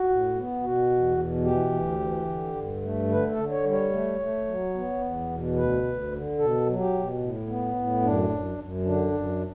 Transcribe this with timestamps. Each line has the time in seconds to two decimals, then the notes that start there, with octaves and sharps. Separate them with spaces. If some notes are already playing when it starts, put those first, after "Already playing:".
Already playing: F#4
0.09 A2
0.36 B3
0.63 B2 F#4
0.90 E2
1.17 B2
1.45 E3 G4
1.72 D2
2.00 E3
2.28 D3
2.55 G2
2.82 A3
3.09 D3 B4
3.30 A4
3.36 D3
3.50 C#5
3.64 G3
3.72 C#5
3.92 A3
4.19 A3
4.46 F#3
4.74 B3
5.01 E2
5.29 B2
5.56 D2 B4
5.84 D2
6.11 D3
6.39 B2 A4
6.66 F#3
6.80 G4
6.93 B2
7.20 A2
7.48 B3
7.75 A2
8.02 F#2 D4
8.29 F#2
8.57 F#2
8.85 D3 D4
9.12 F#2